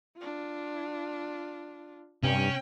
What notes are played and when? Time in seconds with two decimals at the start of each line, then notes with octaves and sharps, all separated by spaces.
0.17 D4 F4
2.23 G2 C3 C#4 G5